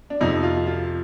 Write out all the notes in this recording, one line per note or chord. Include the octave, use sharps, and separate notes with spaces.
D4
F2 C3 F3 D#4
F4
F4